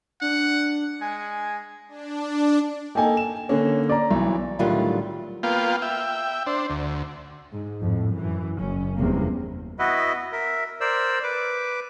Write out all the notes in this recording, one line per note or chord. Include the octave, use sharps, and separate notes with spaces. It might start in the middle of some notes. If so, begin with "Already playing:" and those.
D4 F#5
G#3 G#5
D4
A#3 D#4 A4 G5 G#5
E7
D3 A#3 C#4
D5 A#5
B1 E3
A2 D3 D#3 F#3 G3 F4
A#3 B3 F4 F5 G5
E5 G5
D4 C5
D2
G#2
F2 A2
F#2 E3
F#1 F#2 C#4
F1 E2 C3 G3 A#3
B3 E4 F#4 B4 D#5 E5
A#4 E5
A#4 C5 D5 E6
B4 D6